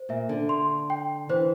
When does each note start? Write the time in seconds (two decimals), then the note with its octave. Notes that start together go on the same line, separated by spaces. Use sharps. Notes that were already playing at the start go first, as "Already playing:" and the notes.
Already playing: C5
0.09 A#2 E5
0.29 D3
0.49 C6
0.90 G5
1.29 E3 C5